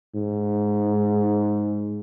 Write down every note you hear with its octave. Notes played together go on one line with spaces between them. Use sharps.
G#2